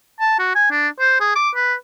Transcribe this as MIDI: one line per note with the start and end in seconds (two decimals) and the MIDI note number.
0.20 0.36 81
0.39 0.54 66
0.55 0.66 80
0.71 0.88 62
1.00 1.17 72
1.20 1.35 68
1.36 1.50 86
1.55 1.74 71